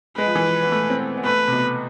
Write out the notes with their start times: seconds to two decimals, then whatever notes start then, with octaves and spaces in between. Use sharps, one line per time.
0.17 G#3 B4
0.26 F3
0.35 E3
0.44 F3
0.62 B3
0.72 A3
0.90 C4
0.99 B3
1.17 B3
1.25 A3 B4
1.48 C3
1.52 B2